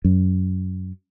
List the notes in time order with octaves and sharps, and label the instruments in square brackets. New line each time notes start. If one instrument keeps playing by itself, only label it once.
[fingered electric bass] F#2